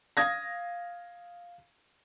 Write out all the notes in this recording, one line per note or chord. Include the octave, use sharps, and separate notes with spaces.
F5 D#6 G#6 A#6